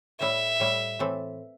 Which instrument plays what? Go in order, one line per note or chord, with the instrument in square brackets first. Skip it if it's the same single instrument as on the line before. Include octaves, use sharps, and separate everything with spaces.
[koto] A2 G3 E4 [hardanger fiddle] E5
[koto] A2 G3 E4
A2 E3 C4 A4